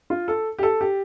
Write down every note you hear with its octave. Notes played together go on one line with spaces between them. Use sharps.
F4
A4
G4
A4
G4